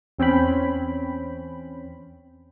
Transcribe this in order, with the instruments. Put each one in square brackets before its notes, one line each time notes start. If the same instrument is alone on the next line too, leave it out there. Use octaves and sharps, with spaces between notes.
[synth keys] E2 C4 C#4 G5 B5